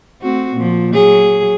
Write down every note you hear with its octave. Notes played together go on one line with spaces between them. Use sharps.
A3 C4 F#4
A#2 F3
F#3 G#4